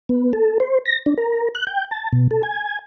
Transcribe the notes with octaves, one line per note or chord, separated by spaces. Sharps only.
B3
A4
C5
A#6
D4
A#4
F#6
G5
A5
B2
A4
G#5